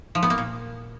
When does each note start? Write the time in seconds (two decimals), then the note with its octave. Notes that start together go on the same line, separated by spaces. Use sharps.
0.15 F3
0.23 B3
0.30 A#3
0.38 A#2